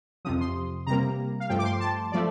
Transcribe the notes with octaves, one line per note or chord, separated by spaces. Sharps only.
F2 C3 F3 D#6
C6
C3 G3 A#3 A#5
F5
G2 F3 A3 G5
D6
C6
A5
F3 A3 D5